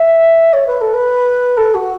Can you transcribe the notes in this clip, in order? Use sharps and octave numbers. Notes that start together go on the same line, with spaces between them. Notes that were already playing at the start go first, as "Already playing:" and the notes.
Already playing: E5
C#5
B4
A4
B4
A4
F#4